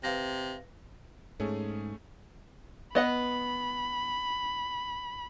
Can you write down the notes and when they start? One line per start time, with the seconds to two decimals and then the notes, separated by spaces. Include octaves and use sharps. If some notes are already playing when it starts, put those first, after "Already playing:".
0.03 C3 B4 F5 A#6
1.40 G#2 A3 C#4 G#4
2.95 B3 D#5 F#5 B5